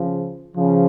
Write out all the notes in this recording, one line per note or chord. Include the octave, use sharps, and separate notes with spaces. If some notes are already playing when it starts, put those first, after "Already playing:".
Already playing: C#3 F3
C#3 F3